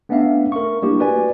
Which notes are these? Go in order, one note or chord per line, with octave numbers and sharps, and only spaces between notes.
A3 B3 C#4 D4 E5 F5
A#4 C#6
G3 A3 A#3 D4 E4 G4
F#4 B4 D5 G#5